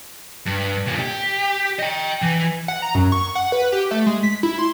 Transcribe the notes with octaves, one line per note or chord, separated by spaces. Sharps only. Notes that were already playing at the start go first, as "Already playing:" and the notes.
G2
D#2 A#2
G4
D#5 G5
E3
F#5
A#5
F#2
C#6
F#5
B4
G4
A3
G#3
B6
E4
C6